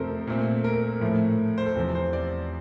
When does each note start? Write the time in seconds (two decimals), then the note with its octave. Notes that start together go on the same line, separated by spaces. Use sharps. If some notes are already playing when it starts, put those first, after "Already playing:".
Already playing: F2 C3 F3 A3 C4 A4 A#4 C5
0.27 A#2 A3 C4
0.64 A#4
1.01 A2 F3 A3
1.58 C5
1.66 A4
1.75 E2 C3 F3 C4
1.95 C5
2.13 D5